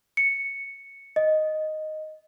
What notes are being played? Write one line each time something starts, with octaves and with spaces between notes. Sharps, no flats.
C#7
D#5